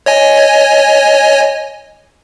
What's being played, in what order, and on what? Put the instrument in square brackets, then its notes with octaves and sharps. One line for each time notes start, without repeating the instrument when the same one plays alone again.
[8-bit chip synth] C#5 D#5 G#5